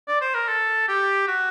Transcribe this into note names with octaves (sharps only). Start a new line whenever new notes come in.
D5
C5
A#4
A4
G4
F#4